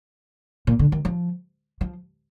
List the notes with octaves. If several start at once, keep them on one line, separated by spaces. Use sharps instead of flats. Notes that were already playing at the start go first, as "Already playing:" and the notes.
A#2
D3
D#3
F3
F3